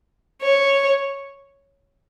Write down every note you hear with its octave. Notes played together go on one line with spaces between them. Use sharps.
C#5